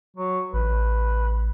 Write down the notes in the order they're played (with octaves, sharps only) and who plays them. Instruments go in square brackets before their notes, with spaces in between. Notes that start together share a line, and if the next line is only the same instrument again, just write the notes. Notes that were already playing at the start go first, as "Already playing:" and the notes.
[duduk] F#3
[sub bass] A1 [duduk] B4